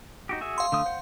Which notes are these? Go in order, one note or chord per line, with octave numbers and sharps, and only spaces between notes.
D#4 F#4 G4
F#4 G#4 E5
F5 C6
D3 A3 D#6
C5 F#5